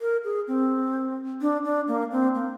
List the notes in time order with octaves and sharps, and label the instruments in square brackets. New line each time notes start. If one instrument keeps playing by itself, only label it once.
[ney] A#4
G#4
C4
D4
D4
A#3
C4
A#3